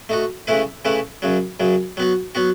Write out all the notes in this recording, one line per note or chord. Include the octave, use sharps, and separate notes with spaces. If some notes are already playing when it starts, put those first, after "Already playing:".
A3 D#4 F#4
C#3 E3 A3 E4 B4
C#3 E3 A3 E4 B4
F#2 C#3 F#3
F#2 C#3 F#3
F#3 B3 F#4
F#3 B3 F#4